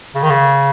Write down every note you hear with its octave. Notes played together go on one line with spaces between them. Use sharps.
C#3
D#3
C#3